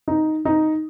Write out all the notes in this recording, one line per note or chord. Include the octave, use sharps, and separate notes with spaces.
D#4
D#4